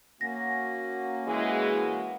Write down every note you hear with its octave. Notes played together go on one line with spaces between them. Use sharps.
A#3 C#4 F#4 A#6
E3 G#3